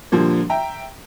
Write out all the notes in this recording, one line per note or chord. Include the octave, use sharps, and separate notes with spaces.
A#2 D3 F3 G3 A#3
E5 G5 A#5